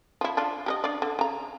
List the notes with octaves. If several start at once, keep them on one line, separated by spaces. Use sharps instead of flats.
F3 E4
D4 F4
G4 A#4 D#5
D4 D5
D3
C#3 A#5